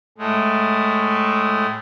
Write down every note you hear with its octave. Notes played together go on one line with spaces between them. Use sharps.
A2 G#3 A3